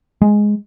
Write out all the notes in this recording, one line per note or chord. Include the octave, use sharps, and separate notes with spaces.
G#3